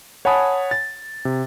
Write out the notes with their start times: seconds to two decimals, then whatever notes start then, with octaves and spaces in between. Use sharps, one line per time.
0.25 C#5 F#5 G#5 A5 B5 D#6
0.71 A6
1.25 C3